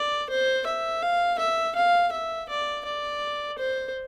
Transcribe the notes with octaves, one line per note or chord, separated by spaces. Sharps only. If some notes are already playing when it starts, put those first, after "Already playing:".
Already playing: D5
C5
E5
F5
E5
F5
E5
D5
D5
C5